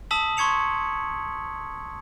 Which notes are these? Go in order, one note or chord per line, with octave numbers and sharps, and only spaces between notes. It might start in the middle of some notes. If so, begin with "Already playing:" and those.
A5 D#6 E6 B6 F#7
C6 C#6 G#6 C#7 F7